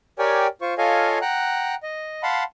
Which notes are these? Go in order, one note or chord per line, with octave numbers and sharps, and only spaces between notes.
G4 A#4 C#5 D5 G5 G#5
F4 C5 C#6
F4 A4 C#5 D#5 F5 G#5
F#5 G5 A#5 F#6
D#5
F5 F#5 A5 B5 C6